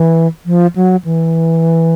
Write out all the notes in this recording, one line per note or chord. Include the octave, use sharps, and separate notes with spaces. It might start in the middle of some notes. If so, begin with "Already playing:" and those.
Already playing: E3
F3
F#3
E3